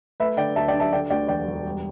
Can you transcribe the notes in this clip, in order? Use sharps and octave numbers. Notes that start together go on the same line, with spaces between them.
A3 B4 E5
D3 D5 G5
D2 E5 A5
D5 G5
D4
E5 A5
D3 D5 G5
D2 D5 G5
E1 D5 G5
E1
G3